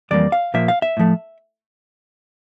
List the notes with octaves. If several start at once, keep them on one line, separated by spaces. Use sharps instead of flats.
F2 E3 G3 A#3 D5
F5
A#2 F3 A#3 E5
F5
E5
A2 F3 A3